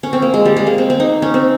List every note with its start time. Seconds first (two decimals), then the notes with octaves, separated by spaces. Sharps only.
0.03 C#4
0.13 C4
0.22 A#3
0.34 G#3
0.45 G3
0.57 G#3
0.67 A#3
0.78 C4
0.90 C4
1.00 D#4
1.22 C#4
1.34 C4